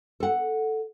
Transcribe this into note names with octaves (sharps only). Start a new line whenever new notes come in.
A4 F#5